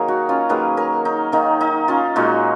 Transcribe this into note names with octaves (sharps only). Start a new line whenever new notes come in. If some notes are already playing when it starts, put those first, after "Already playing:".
Already playing: D#3 F#3 A#3 G#4 A#4 C#5
D#4 F#4
C#4 F4
D#3 F#3 A#3 G#4 B4
A#4 C#5
D#4
D#3 A#3 D#4
D#4
C#4 F4
A#2 G#3 D#4 F#4